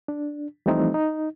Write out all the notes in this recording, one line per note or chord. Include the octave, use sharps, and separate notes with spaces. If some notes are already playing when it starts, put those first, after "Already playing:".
D4
E3 F3 G3 A3 C4 D#4
D#4